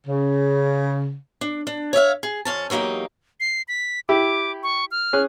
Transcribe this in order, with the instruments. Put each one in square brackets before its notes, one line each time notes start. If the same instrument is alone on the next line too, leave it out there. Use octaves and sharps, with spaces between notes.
[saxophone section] C#3
[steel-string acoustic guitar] D4
D4
C#5 D5 E5 F5
G#4
F2 C#4 A5
E2 F#3 A#3 D#4 G4
[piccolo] C7
B6
[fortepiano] E4 G4 [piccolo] D6
[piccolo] C#6
F6
[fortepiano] C#4 G#4 F#6